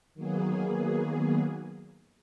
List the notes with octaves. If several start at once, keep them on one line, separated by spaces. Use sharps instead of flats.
D#3 F#3 A#3 B3 G#4